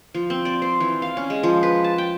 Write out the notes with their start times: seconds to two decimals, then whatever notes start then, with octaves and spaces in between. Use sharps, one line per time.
0.14 F3
0.30 C4
0.45 D5
0.62 C5
0.80 E3
1.02 F5
1.17 C#4
1.30 G#3
1.43 F3
1.63 B4
1.84 A5
1.98 G5